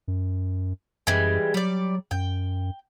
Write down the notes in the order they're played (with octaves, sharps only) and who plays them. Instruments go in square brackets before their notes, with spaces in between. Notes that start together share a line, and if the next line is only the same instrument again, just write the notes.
[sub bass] F#2
[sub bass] F#2 [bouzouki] E3 G3 G#3
[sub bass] F#3 [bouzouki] G3 D5
[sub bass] F#2 [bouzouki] G5